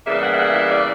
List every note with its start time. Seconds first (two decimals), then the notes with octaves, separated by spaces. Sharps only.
0.05 E2 C#3 E3 G3 A#3 E5
0.22 F#5
0.33 E5
0.38 F#5
0.54 E5
0.71 D5